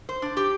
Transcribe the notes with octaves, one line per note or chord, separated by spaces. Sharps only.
C5
D4
G4